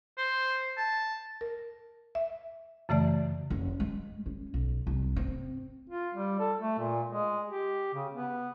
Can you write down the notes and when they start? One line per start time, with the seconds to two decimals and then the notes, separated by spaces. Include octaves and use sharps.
0.18 C5
0.77 A5
1.41 A#4
2.15 E5
2.89 F#2 C#3 E3 A3 D5
3.50 F#1
3.80 G#3
4.26 C#4
4.54 B1
4.87 C2
5.16 C4
5.90 F4
6.15 G3
6.39 A4
6.60 A3
6.79 A#2
7.07 G#3
7.48 G4
7.94 C#3
8.13 B3